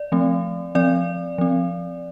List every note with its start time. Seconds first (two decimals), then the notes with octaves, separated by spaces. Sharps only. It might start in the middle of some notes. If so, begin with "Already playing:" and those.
Already playing: D5
0.12 F3 A3 C4
0.75 F3 C4 D5
1.38 F3 C4